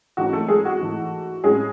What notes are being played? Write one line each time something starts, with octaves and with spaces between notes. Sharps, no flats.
G#2 E3 A3 C#4 F#4
A3 A4
G#3 G#4
F#4
G#2 E3 A3
A2 G#3 C#4 G#4